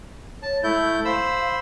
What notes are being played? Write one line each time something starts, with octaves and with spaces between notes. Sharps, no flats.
C#5 A5
G#3 A3 E4 G6
C5 F5 B5 E6